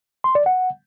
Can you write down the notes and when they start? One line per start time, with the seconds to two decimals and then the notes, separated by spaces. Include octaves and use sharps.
0.24 C6
0.35 D5
0.46 F#5